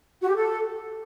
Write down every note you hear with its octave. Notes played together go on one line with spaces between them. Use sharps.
F#4
G4
A4